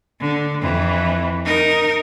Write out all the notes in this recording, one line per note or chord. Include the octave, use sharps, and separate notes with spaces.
D3
F2 E3
D#4 A#4